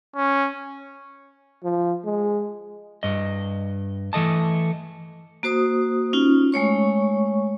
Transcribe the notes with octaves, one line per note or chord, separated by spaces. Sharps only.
C#4
F3
G#3
G2 D#5
E3 A3 D#5 A5
A#3 F#4 C5 D#6
C#4 D#4 F4
G#3 A3 C#5 C#6